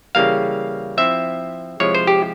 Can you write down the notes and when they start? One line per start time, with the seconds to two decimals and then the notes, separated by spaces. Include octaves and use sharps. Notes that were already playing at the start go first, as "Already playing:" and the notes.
0.15 C#3 E3 G3 A#3 F5
0.97 F3 C4 E4 E5
1.80 C3 F3 G#3 E4 C#5
1.95 C5
2.07 G4